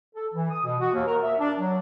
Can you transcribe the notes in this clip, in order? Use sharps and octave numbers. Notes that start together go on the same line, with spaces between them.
A4
E3
D#6
B2
F#4
D#2
A#4
E5
D4
F#3